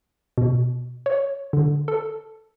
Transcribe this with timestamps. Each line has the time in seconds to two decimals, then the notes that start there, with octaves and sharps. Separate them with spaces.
0.38 B2
1.06 C#5
1.53 D3
1.88 A4